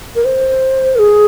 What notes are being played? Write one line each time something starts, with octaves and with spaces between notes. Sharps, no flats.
A#4
C5
A#4
G#4